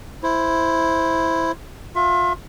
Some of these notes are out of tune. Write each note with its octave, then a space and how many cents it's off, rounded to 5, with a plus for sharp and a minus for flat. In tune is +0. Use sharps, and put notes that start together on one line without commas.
E4 +0 C5 +0
F4 +30 E5 +30